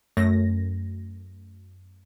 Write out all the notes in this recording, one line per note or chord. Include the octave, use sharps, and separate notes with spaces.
F#2 A3 A#6